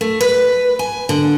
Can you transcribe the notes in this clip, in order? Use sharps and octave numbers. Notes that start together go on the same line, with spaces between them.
A3
B4
G#5
D3